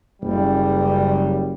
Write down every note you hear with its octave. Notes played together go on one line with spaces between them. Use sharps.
F#1 G3